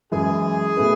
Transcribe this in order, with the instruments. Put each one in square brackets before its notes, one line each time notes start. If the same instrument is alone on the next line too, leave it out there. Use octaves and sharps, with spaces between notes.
[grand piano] F#2 E3 G#3 [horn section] G#4
[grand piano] B2 A3 E4 B4